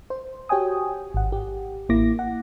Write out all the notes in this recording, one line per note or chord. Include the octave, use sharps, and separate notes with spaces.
C5
F#4 G4 C#5 G5 G#5 D#6
G#1 F#5
G4
A1 A#3 E4 D6 A#6
F#5